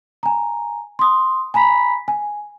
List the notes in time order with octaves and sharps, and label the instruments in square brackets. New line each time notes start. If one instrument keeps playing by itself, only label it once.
[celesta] G#5 A#5
C6 D#6
G#5 A#5 B5 B6
G#5